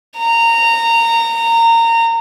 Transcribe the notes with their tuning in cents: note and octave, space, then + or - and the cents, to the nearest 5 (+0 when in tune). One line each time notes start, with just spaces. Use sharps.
A#5 -20